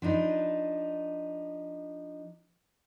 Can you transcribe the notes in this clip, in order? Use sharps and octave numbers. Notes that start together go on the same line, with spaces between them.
F3 D4 D#4 B4